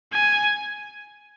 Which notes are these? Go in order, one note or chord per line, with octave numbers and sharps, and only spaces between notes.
G#5